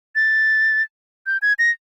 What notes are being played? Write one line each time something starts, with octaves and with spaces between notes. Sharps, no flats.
A6
G6
G#6
A#6